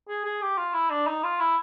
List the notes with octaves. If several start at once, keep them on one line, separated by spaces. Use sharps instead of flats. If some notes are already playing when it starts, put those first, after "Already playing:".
G#4
G#4
G4
F4
E4
D4
D#4
F4
E4